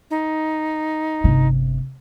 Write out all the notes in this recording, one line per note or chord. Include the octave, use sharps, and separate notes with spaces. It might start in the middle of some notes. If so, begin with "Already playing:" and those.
D#4
G1 C3